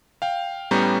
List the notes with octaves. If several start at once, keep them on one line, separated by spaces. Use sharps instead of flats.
F5 G5
A2 G3 B3 C#4 A#5 G6